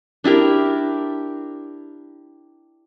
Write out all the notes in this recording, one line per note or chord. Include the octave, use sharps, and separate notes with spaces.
D4 E4 G4 A#4